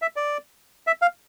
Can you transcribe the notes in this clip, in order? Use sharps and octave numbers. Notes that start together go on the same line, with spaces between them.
E5
D5
E5
F5